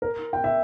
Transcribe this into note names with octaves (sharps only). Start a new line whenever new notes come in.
A#4
G5
E5